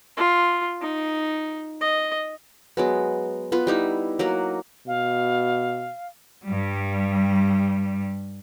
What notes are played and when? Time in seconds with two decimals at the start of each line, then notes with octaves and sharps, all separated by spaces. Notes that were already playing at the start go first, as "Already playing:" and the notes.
0.17 F4
0.81 D#4
1.81 D#5
2.77 F#3 G#3 B3
3.52 B3 F4 B4
3.67 G3 D#4 E4
4.19 F#3 A#3 A#4 F#5
4.87 B2 F5
6.45 G2 G3